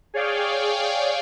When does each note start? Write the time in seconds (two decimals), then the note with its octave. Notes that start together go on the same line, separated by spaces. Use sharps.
0.14 G#4 C#5 D5 F5 G5